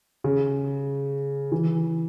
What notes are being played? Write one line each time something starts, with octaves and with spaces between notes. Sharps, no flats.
C#3
E3